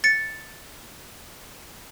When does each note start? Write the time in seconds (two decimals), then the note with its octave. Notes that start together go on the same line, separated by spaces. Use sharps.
0.04 A6 C#7